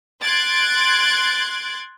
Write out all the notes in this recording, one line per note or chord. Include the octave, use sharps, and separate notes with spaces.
C6 F#6 G#6 A6 D7